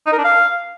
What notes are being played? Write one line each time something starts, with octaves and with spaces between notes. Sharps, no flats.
D#4
A#4
D4
F5